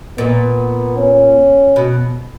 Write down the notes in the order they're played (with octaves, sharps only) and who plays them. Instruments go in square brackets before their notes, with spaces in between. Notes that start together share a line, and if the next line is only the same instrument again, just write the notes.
[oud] A#2 [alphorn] B3
[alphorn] C#4
[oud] B2